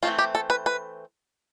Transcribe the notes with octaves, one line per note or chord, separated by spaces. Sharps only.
E3 A3 C4 F4
G4
A4
B4
B4